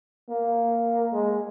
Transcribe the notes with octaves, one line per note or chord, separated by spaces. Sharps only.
A#3
G#3